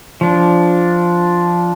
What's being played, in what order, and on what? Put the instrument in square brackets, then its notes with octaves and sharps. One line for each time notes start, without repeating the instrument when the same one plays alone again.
[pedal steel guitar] F3 D4